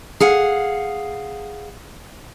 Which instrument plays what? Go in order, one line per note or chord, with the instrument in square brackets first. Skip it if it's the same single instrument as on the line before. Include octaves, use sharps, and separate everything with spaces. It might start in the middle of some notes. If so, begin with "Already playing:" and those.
[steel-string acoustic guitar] G#4 F5 F#5